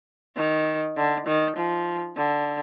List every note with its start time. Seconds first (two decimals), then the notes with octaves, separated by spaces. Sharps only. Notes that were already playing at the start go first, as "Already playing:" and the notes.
0.36 D#3
0.97 D3
1.26 D#3
1.56 F3
2.17 D3